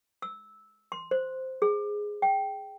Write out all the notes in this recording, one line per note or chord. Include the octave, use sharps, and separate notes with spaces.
E6
C6
C5
G#4
G5